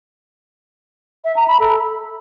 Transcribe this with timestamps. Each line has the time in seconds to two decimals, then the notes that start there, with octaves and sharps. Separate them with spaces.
1.25 E5
1.36 A#5
1.48 B5
1.60 A4